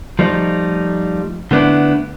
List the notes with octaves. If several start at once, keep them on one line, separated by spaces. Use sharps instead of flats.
F3 G3 A3 D#4
D3 A3 B3 D4 E4